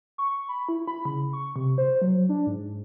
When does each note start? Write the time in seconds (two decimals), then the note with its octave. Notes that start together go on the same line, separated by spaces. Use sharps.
0.18 C#6
0.49 B5
0.69 E4
0.88 B5
1.05 C#3
1.33 C#6
1.56 C3
1.78 C5
2.02 F#3
2.29 D4
2.47 G#2